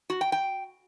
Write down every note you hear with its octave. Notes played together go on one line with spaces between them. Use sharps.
F#4
G5
G5